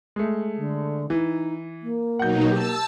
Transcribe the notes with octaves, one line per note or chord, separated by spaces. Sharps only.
G#3 A3
D3
E3 D#4
A#3
B2 F#3 D#4 F#5 G6
G4 A5 E6